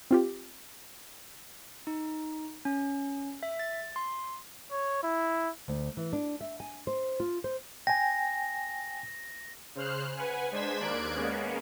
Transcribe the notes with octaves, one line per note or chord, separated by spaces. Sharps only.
C4 F4 G4
D#4
C#4
E5
A6
C6
C#5
E4
D2
E3
D4
E5
G#5
C5
F4
C5
G5 G#5 A#6
C#3 C5 F6 F#6
B4 F#5 G#5
G#3 D4 C5 G#6 B6 E7
D#2 A#3 D5 F#6 G#6 D7
G#3 A#3 B3 C#4